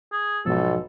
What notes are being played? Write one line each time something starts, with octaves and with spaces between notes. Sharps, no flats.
G#4
B1 G#2 B2 F3 A4